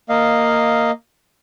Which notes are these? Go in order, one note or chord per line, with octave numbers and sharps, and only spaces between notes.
A#3 D#5 F5